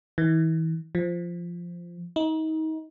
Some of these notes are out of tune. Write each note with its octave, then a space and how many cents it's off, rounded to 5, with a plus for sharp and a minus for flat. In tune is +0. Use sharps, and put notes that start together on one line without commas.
E3 -40
F3 -10
D#4 +30